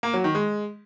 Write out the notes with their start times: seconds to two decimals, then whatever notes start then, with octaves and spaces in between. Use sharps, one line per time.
0.03 A#3
0.14 F#3
0.24 D#3
0.35 G#3